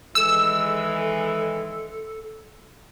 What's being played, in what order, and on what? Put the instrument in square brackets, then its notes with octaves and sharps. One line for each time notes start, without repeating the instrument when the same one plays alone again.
[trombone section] D#3 E3 G#3 [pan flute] A4 [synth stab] E6